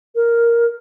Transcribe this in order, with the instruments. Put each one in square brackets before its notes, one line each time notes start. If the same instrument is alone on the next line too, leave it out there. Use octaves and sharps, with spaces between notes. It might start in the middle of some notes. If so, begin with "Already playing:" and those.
[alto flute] A#4